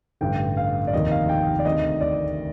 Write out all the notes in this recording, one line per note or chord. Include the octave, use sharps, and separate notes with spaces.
A1 G2 D3 G5
F5
D5
F1 D#2 D#3 D#5
F5
G5
D5
D2 C3 D#3 D#5
D5